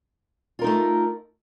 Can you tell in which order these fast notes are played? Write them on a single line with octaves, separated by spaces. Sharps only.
F4 A#4 D#4 A3